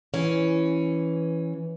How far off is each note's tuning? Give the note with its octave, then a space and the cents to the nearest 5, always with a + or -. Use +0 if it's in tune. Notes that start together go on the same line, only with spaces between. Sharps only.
E3 +0 C#4 +0